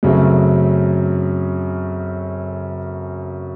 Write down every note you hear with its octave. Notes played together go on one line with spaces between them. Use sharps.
F#2 C#3 F#3 A3 C4